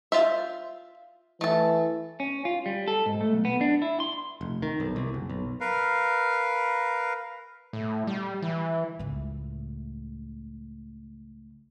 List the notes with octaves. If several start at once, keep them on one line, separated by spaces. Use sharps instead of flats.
F4 C5 E5
E3 A3 A4
C#4
F4
G3
A4
G#2
A3
B1
B3
D4
E4
C6
F1
D#3
B1
C2
F#1
B1
A#4 B4 F5
A2
G3
E3
C#2 A2